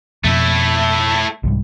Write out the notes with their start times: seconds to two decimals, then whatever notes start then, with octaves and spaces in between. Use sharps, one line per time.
0.24 F2 B2 A3 E4
1.44 C2 G#2 G3